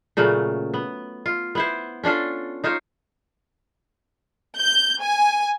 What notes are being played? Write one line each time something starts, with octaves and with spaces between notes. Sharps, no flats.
A#2 C#3 F#3 A3
B3
F4
B3 E4 C5
C#4 D4 F4 A4
D#4 F4 C5 C#5
G6
G#5